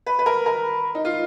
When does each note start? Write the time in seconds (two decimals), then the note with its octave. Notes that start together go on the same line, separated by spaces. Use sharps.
0.07 B4
0.19 B4
0.26 A#4
0.46 A#4
0.95 D#4
1.05 F4